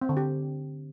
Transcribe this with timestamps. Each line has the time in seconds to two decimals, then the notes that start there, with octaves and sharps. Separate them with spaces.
0.02 C4
0.09 D3
0.17 G4